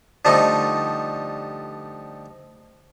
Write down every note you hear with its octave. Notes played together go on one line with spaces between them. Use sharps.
D3 F3 G3 A3 D#4